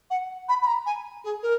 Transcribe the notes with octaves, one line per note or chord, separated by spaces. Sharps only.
F#5
B5
B5
A#5
G#5
G#4
A#4